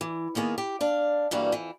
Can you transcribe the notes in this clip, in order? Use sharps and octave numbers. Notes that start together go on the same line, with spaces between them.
E3
D#3 A#3 B3 G#4 A#4
G4
D4 F5
G2 D3 E3 G3 A#3 F#4
F2 E3